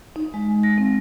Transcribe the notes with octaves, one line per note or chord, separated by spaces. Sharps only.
D#4
G#3
A#6
C4